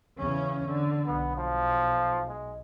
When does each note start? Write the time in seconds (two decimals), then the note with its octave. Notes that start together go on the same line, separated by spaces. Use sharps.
0.18 E2 C#3 C#4
0.65 D3
1.06 B1 B3
1.37 F3
2.28 G#3